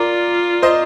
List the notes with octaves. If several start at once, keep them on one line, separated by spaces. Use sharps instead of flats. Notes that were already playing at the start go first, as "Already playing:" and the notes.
Already playing: F4 A#4 D5
C5 D#5